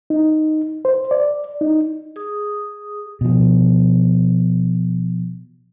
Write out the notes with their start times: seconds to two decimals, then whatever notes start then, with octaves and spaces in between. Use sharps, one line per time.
0.10 D#4
0.85 C5
1.11 D5
1.61 D#4
2.16 G#4 D#6
3.21 B2 F3